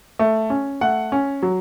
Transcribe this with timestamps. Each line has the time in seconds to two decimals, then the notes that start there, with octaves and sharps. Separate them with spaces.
0.19 A3
0.50 C#4
0.81 A3 F#5
1.12 C#4
1.43 F#3